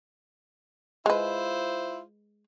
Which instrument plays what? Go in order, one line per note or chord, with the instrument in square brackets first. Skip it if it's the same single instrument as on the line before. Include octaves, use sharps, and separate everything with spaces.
[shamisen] G#3 B4 [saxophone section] E4 F4 C5